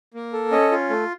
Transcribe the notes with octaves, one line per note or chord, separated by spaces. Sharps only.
A#3
A4
C#4 D#5
F4
A3